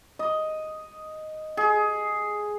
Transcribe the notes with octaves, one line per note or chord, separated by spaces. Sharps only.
D#5
G#4